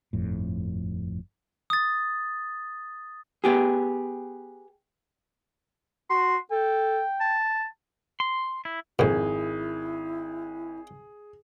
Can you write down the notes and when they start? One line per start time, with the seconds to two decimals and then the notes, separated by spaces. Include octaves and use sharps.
0.13 G1 F2 A2
1.70 D#6 A6
3.44 B3 G4 G#4
6.10 F#4 C6
6.52 A4 G5
7.21 A5
8.20 C6
8.65 E4
8.99 G#1 F2 A#2 E4 G#4